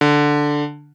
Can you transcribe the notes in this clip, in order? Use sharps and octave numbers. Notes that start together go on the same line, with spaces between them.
D3